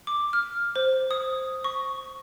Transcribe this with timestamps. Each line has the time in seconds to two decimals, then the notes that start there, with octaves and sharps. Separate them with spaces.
0.07 D6
0.33 F6
0.76 C5
1.11 D#6
1.64 C#6